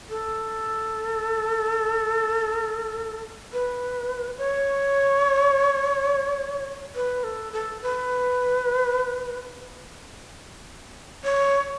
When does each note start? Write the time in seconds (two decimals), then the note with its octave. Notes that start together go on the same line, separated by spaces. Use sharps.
0.10 A4
3.53 B4
4.38 C#5
6.95 B4
7.24 A4
7.53 A4
7.82 B4
11.24 C#5